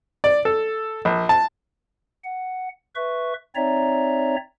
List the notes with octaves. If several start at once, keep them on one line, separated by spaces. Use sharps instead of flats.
D5
A4
A#1
A5
F#5
B4 E5 C#6
C4 D#4 C#5 D5 E5 A#5